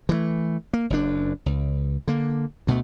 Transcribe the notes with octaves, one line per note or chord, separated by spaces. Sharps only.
E3 G3 A3
A#3
F#1 F#2 D4
C#2
D3 A#3
D2 B2 G#3 A3